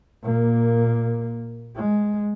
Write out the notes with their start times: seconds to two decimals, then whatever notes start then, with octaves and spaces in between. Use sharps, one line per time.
0.23 A#2 A#3
1.76 G#3